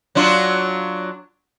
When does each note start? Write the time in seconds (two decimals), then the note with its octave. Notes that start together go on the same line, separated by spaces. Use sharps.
0.15 F#3 D4 F4